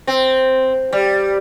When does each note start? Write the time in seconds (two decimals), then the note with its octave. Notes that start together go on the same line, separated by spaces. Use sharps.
0.07 C4
0.93 G3